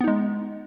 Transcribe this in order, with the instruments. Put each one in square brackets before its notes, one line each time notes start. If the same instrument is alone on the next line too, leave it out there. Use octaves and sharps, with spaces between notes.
[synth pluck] B3
D#4
G#3